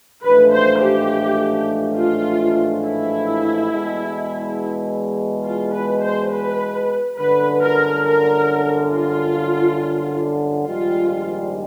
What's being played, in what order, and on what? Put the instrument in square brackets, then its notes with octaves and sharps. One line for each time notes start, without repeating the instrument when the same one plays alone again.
[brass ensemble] A1 G#2 F3 A3 D4 [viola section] B4
[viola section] C5
G4
F4
E4
[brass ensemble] E2 B2 G#3
[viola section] F4
B4
C5
B4
[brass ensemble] G1 F#2 D3 [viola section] B4
[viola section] A#4
A#4
F4
[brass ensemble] A#1 G#2 D#3 G3 [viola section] F4